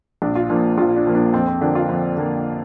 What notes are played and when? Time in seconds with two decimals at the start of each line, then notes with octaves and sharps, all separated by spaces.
0.22 A#1 D4
0.35 F4
0.49 A#2 F3 A#3 D4
0.78 A#1 F4
0.96 D4
1.05 A#2 F3 A#3
1.15 D4
1.34 F2 C4
1.47 C4
1.61 D3 F3 A#3 D4
1.75 F4
1.89 F2 C4
2.17 D3 F3 A#3